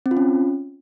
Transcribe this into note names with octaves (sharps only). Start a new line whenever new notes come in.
C4
F4
C#4